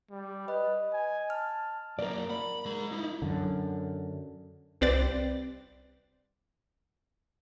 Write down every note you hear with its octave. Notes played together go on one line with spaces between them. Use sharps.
G3
B4 D#5
G#5
A5 F6
F#2 A#3 A#4 D5
B5
G#3 A#5
D#4 E4
F#2 D3
C2 C4 B4 D5 A6